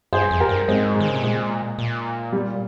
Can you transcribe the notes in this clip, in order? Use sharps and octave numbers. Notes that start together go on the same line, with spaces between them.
G2 G#4 C5
F2
G4 A#4
G2
G#2 G#3 C4
G#3
D#3
C#3
C3
A#2 G#3
A#2
G3